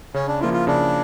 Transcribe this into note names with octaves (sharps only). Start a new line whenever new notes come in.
C#3 C#4
D4
F3 A#3 E4 F4
F4
C#3 D4